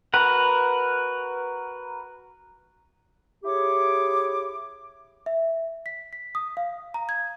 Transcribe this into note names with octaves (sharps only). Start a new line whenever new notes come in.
F#4 A#4 B4 F#5
E4 G4 G#4 C#5 D6
E5
B6
B6
D#6
F5
A#5
G#6